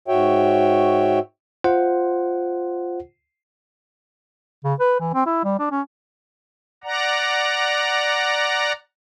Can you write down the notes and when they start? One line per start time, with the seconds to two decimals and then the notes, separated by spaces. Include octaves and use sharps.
0.08 G#2 F#4 C#5 E5 G5
1.64 F4 C5 F#5
4.64 C#3
4.80 B4
5.00 E3
5.14 C4
5.26 E4
5.44 G3
5.59 D4
5.71 C#4
6.84 D5 F#5 A#5